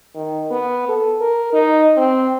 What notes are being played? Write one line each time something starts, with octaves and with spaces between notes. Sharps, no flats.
D#3
B3
A4
A#4
D#4
C4